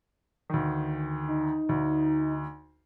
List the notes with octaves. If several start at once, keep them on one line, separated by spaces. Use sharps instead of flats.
D2 D#3
D#4
D2